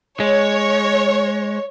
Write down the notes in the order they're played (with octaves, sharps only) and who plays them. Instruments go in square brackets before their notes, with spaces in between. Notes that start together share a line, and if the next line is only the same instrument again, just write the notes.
[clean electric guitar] G#3 [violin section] C#5